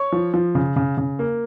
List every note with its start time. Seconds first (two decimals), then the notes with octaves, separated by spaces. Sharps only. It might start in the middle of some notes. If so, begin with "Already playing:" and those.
Already playing: C#5 C#6
0.12 F3
0.34 F3
0.55 C#3
0.76 C#3
0.98 C#3
1.19 A#3